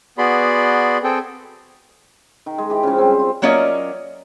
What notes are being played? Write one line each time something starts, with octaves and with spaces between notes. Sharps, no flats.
B3 F#4 G#4 D5 B5 C6
C4 G#4 A4 G5
D#3
G#3
E3 G4
C#3 F3 G#3 C#4
G3 C4
F4
F#3 A#3 C#4 F4 D5 D#5